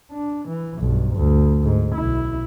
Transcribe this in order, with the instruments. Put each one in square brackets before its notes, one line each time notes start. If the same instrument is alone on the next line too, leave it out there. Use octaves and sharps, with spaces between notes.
[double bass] D4
E3
B1 G2
D2
G#2
B1 E4